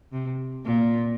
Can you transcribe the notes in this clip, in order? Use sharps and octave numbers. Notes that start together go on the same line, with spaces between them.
C3
A#2